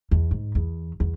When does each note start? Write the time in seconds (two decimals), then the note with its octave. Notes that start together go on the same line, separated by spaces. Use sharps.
0.11 E2
0.31 G#2
0.55 E2
1.00 E2